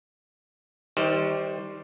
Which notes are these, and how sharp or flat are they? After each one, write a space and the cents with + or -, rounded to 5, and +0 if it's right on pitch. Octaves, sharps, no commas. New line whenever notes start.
D#3 +35 G3 +0 C5 +0